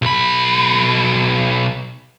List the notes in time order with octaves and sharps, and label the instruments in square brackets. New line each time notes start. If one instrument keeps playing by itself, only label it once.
[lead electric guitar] B1 B5